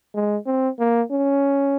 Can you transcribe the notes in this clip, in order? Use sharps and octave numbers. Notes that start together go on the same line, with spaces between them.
G#3
C4
A#3
C#4